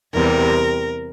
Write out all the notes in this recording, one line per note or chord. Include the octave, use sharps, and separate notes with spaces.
E2 C3 G3 A#4